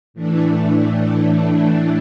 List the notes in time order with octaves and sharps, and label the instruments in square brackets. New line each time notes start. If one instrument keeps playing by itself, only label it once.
[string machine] A2 E3 A3 D4